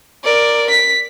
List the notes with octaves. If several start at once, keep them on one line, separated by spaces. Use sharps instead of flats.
A#4 D5
B6